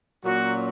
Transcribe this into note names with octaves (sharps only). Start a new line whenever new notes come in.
A#2 F#3 A#3 C#4 F#4